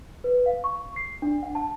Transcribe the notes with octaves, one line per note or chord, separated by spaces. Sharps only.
B4
F5
C#6
C7
D4
F#5
A5